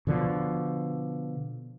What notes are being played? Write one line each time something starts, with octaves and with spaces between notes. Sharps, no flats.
B2 D3 F3